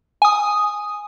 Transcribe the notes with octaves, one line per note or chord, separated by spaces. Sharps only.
G#5 D#6